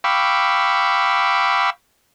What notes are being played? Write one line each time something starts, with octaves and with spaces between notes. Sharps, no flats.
F5 G5 B5 C#6 D6 E6